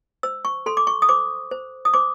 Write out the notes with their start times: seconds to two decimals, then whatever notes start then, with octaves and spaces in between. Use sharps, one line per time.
0.23 C5 E6
0.45 C#6
0.66 A4 C6
0.77 D6
0.87 C#6
1.02 D#6
1.09 C5 D6
1.51 C5
1.85 D#6
1.94 C5 D6